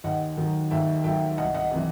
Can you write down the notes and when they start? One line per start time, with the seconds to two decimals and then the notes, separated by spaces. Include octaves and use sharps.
0.04 D#2 D#5 F#5
0.37 D#3 F#3
0.70 D#2 E5 G5
1.04 D#3 F#3 E5 G5
1.38 C2 D#5 F#5
1.54 D#5 F#5
1.71 C3 E3